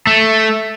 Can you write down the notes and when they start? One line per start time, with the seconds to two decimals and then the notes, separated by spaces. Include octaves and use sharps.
0.07 A3